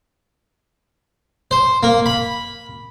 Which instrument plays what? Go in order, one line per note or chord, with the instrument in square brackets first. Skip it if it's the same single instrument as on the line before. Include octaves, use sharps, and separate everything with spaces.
[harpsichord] C5
A#3
B5